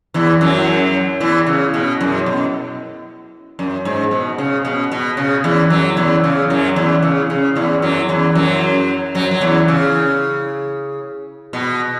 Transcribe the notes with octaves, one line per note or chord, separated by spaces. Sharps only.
E2 E3
F#2 F#3
E2 E3
C#3
B2
F#2
B2
F#2
G#2
B2
C#3
B2
B2
C#3
E2 E3
F#2 F#3
E2 E3
C#3
F#2 F#3
E2 E3
C#3
C#3
E2 E3
F#2 F#3
E2 E3
F#2 F#3
F#2 F#3
F#3
E2 E3
C#3
B2